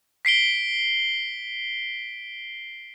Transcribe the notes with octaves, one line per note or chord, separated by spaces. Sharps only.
B6 C7 D7 G7